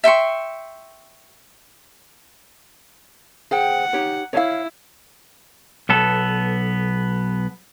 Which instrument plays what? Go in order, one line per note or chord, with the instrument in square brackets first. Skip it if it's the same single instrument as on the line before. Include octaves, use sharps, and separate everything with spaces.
[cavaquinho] E5 G5 C6 C#6
[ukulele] G#4 C5 G5 [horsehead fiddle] F#5
[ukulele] D#4 G4 C#5
[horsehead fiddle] E4 [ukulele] C#5 F5
[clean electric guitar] B1 B3 A4